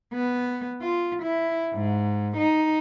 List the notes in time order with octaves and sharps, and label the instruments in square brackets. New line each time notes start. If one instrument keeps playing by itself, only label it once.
[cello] B3
F4
E4
G#2
D#4